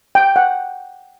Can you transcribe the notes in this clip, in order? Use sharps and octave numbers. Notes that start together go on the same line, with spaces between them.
G5
F#5